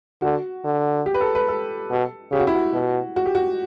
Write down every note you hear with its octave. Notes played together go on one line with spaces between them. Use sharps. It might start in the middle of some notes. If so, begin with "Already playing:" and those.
D3 F#4
D3
G4
B4
A4
B4
A4
B2
C#3 G4
F#4
E4
F#4
B2
F#4
G4
F#4